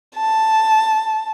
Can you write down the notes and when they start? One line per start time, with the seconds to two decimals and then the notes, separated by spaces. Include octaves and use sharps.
0.16 A5